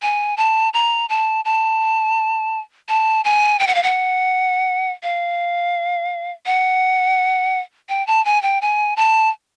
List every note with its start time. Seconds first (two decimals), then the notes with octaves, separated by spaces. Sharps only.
0.02 G#5
0.37 A5
0.73 A#5
1.09 A5
1.45 A5
2.89 A5
3.24 G#5
3.60 G5
3.67 F#5
3.75 F5
3.83 F#5
5.03 F5
6.46 F#5
7.89 G5
8.07 A5
8.25 G#5
8.42 G5
8.62 G#5
8.97 A5